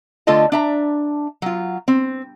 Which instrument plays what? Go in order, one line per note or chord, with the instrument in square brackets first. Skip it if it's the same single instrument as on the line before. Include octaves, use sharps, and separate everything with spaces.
[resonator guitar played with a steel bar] D3 A3 F4 A4 D#5 A5
D4 E5 A#5
F#3 F4
C4